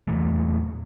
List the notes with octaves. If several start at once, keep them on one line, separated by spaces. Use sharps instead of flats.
E2 A#2 E3 A3